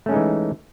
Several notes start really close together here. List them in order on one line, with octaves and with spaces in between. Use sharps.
A3 C#4 G#3 D#4 E3